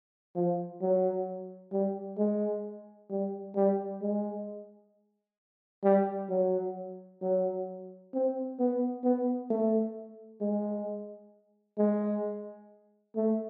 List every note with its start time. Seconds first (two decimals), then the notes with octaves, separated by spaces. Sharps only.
0.36 F3
0.82 F#3
1.72 G3
2.18 G#3
3.11 G3
3.56 G3
4.02 G#3
5.84 G3
6.30 F#3
7.22 F#3
8.14 C4
8.59 B3
9.04 B3
9.50 A3
10.41 G#3
11.78 G#3
13.16 A3